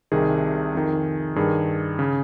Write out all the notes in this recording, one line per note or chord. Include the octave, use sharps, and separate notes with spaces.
C2 C3 D#3 G#4
F2 D#3
G2 D#3 G#4
C#3